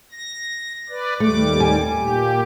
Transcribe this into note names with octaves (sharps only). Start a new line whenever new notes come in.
A#6
B4 D5
D#2 G3 A3 D6
G#5
A#2 G4